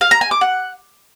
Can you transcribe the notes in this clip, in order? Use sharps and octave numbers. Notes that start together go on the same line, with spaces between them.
F5
A#5
G#5
D6
F#5